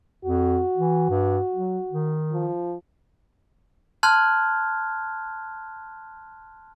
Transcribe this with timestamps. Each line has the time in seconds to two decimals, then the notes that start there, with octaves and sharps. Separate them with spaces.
0.25 F2 F#4
0.77 E3
1.10 G2
1.54 F#3
1.91 D#3
2.32 F3
4.03 A5 C6 F6 F#6 G#6